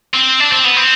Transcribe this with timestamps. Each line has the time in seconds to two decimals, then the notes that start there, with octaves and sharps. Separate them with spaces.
0.14 C4
0.40 D4
0.52 C4
0.64 B3
0.77 C4